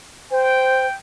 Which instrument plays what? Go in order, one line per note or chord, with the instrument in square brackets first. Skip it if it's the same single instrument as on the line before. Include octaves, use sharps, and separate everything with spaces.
[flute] C5 [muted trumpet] G5